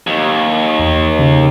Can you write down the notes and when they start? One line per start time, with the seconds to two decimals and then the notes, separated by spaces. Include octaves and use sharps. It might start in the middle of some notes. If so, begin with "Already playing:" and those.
0.07 D#2
0.79 E2
1.19 C#3